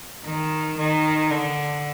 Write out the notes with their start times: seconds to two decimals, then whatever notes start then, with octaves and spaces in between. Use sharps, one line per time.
0.25 D#3
0.78 D#3
1.30 D3